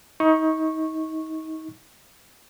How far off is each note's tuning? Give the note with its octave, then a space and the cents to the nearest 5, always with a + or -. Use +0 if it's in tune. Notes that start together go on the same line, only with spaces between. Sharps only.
D#4 +30 C#6 -10